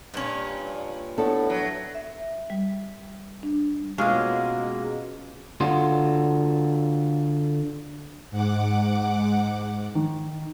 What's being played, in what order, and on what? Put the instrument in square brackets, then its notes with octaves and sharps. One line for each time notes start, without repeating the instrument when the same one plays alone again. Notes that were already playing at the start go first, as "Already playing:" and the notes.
[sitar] G2 [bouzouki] A#2 C#4
[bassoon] A2 [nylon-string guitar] B3 D4 A4
[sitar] F#3
[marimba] E5
G3
D4
[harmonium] B2 [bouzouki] G#3 A#3 [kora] C#4 F4 G#4
[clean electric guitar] D3 F4 F#4 C6
[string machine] G#2 F#5 D6
[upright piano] D#3